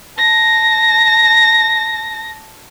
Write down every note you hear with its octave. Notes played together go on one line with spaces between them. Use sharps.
A5 A#6